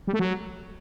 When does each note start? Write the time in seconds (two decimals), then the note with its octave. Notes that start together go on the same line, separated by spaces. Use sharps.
0.07 G3
0.13 A3
0.19 F#3